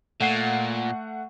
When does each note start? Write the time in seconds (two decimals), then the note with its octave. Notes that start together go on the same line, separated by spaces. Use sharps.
0.20 A#2 A3 F#5 C7